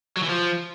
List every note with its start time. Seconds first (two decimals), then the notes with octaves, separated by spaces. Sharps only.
0.17 F#3
0.23 E3
0.29 F3